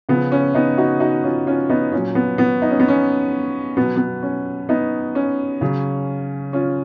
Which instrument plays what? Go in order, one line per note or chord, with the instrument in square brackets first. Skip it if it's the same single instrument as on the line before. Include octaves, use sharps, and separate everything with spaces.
[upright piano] C#3 F3 B3
C#4
B3 D#4
D#4 F#4
D#4 F#4
C#4 F4
C#4 F4
B3 D#4
A#2 F#3 C#4
B3
B3
D#4
C#4
B3
C#4
B2 F#3 B3
B3
C#4
B3 D#4
C#4
C#3 F#3
C#4 F4